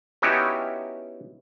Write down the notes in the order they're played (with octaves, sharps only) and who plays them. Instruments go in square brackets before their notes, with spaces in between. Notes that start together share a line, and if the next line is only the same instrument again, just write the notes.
[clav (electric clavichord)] B3 C#4 D#4 E4 F#4 G4